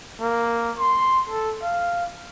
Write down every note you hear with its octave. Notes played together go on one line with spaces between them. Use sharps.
A#3
C6
A4
F5